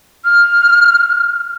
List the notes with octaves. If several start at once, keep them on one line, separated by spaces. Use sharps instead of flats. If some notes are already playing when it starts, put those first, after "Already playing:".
F6